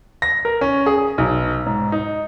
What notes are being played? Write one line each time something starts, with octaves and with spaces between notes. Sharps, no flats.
A#6
A#4
C#4
G#4
B1
G#2
D#4